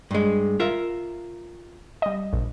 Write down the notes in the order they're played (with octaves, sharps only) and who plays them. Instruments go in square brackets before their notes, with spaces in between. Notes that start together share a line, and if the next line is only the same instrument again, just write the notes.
[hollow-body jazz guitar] G2 G#3
F4 A#4 E5
[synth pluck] G3 D#5
A#1